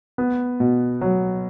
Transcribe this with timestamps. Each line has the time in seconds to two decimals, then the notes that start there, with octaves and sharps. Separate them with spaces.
0.18 B3
0.60 B2
1.01 F#3